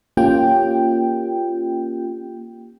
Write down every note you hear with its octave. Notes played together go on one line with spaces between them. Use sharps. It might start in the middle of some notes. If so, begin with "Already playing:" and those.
A#3 C#4 F4 G4 G5